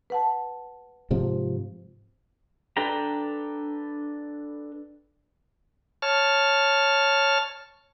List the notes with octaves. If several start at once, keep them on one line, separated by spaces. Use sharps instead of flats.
B4 F#5 A5
G#2 C3 F3
D4 A4 B4 G5 A#5
C#5 A5 F6